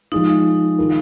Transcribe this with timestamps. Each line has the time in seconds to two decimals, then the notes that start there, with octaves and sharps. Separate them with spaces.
0.12 F3 G#3 D#4 F4
0.78 D#3 G#3 F4 A#4